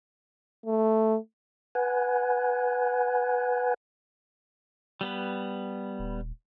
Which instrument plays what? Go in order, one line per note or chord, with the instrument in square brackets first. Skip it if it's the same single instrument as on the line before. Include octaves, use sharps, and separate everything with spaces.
[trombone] A3
[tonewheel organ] B4 F#5 G#5
[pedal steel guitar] G3 B3 B4
[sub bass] D#1